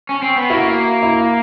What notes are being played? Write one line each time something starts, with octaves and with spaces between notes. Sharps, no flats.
C#4
C4
B3
A#3 E4 F#4
E4